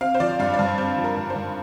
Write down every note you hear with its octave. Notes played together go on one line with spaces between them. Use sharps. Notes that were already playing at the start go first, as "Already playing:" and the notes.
C4 F5
C5
F3 D5
G2 F5
D5
G2 F5
C4 C5
F3
A#4
G2
C5
G2